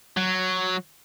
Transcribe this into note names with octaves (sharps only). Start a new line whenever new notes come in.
F#3